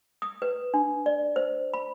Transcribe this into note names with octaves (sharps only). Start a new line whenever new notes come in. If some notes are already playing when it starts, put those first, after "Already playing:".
D#6
B4
D4
D5
C5
B5